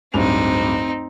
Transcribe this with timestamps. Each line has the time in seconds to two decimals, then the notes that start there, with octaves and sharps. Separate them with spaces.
0.14 D1 G2 C4 D#4 F7